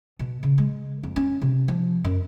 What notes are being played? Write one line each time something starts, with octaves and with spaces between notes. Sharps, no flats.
B2
C#3
G#3
F2
C#4
C3
F3
F#2